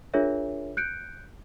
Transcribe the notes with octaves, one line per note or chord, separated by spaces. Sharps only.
D4 F4 G#4 A#4 C#5 E5
F#6 G6 C#7 D7